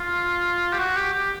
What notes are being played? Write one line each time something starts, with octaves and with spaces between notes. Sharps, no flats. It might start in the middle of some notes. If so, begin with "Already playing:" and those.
Already playing: F4
G4
F#4
G4
G4